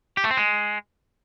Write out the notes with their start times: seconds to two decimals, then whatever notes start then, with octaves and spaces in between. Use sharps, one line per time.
0.17 G4
0.24 A3
0.31 C4
0.37 G#3